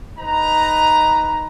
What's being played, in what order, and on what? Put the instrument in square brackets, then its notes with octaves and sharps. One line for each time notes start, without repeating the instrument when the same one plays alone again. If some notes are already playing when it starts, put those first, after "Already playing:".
[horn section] D#4 B4 A#5